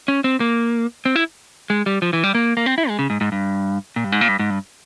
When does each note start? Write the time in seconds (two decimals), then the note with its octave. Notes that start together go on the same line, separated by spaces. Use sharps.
0.08 C#4
0.24 C4
0.40 A#3
1.05 C4
1.16 E4
1.70 G#3
1.86 G3
2.02 F3
2.13 E3
2.24 G3
2.35 A#3
2.57 A#3
2.66 C4
2.78 E4
2.89 G#3
2.99 C#3
3.10 G#2
3.21 G#2
3.32 G2
3.96 A#2
4.04 G2
4.12 G#2
4.21 A#2
4.28 G2
4.39 G#2
4.50 G2